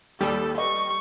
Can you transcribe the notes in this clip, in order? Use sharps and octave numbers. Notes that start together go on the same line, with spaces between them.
D#2 G3 A4
B4 D#5 C#6